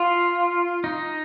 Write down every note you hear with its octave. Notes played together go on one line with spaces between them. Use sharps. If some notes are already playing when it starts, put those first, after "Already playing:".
Already playing: F4
D#4